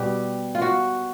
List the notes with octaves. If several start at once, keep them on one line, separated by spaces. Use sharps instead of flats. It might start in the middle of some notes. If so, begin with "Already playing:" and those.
Already playing: B2 G3 G4
F4
F#4